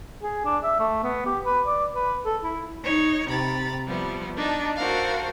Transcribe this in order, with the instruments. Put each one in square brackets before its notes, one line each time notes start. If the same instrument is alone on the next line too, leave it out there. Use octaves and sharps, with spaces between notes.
[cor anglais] G#4
D4
E5
A3
B3
G4
B4
D5
B4
A4
E4
[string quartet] D#4 C#5
C3 A#5 B5 A6
F3 G3 B3 E4
D4 D#4 A5
F#4 A4 A#4 C5 F5 F#5